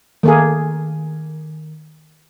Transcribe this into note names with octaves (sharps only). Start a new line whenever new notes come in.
D#3 A3 A#3 G#4